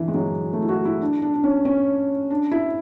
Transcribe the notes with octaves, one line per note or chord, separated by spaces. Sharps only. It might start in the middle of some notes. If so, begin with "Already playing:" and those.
Already playing: D3 E3
G#3
F#3
A3
E4
F#4
E4
D4
D4
D4
C#4
C#4
D4
E4